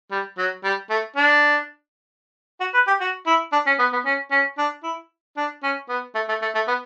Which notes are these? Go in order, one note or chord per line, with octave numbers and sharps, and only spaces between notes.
G3
F#3
G3
A3
D4
F#4
B4
G4
F#4
E4
D4
C#4
B3
B3
C#4
C#4
D4
E4
D4
C#4
B3
A3
A3
A3
A3
B3